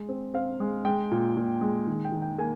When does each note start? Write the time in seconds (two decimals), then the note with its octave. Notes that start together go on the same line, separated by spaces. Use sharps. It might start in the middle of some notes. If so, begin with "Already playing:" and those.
Already playing: G#3
0.09 C4
0.34 C4 F5
0.60 G#3
0.85 G#3 G5
1.11 A#2
1.37 A#2
1.61 G#3
1.87 D#3
2.05 G5
2.12 D#3
2.22 G5
2.38 A#3 G#5